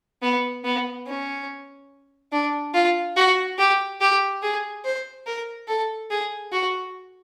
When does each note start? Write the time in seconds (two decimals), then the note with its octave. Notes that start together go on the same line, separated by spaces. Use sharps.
0.22 B3
0.64 B3
1.07 C#4
2.32 D4
2.74 F4
3.16 F#4
3.59 G4
4.01 G4
4.43 G#4
4.84 C5
5.26 A#4
5.68 A4
6.10 G#4
6.52 F#4